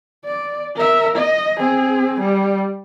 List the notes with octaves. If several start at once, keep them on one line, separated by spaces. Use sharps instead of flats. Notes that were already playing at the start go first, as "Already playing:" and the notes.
D5
A#4 E5
D#5
C4 G#4
G3